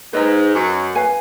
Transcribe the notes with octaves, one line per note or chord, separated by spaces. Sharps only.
G#2 B4 D#5 A#5
F#2
B4 F5 G#5